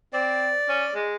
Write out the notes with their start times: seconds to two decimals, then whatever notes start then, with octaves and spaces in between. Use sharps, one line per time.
0.13 C4 D5
0.69 C#4
0.95 G#3